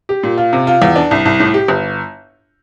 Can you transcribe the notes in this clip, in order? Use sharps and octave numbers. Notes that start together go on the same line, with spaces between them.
G4
A#2
F4
C3
F4
E2
D4
C2
C2
A2
G4
G1